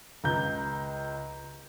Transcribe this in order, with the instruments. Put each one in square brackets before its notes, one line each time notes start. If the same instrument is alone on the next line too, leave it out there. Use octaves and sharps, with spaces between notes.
[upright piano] C#2 A#5 G6